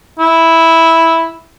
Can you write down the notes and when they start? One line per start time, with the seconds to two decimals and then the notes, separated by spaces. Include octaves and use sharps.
0.19 E4